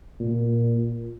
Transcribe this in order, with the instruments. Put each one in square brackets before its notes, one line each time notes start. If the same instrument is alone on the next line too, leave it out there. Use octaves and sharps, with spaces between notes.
[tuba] A#2